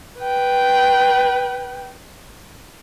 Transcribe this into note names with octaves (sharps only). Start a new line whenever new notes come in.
B4 G5